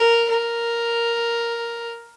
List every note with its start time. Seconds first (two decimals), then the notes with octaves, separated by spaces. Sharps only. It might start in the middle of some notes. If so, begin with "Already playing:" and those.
Already playing: A#4
0.30 A#4